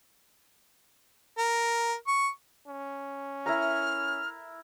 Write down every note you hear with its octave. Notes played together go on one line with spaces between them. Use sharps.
A#4
C#6
C#4
E4 A#4 A#5 F6